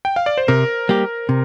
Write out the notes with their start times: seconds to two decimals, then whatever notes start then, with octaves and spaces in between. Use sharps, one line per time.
0.05 G5
0.16 F5
0.26 D5
0.37 C5
0.48 C3 A#4
0.89 G3 A#3 G4
1.29 C3